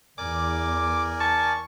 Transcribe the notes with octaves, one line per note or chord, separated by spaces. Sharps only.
E2 A#4 D5 G#5 D6
A5 C#6